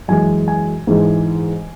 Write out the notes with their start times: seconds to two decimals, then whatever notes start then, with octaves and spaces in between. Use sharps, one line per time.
0.08 F#2 E3 G#3 G#5
0.48 G#5
0.87 G#2 E3 G#3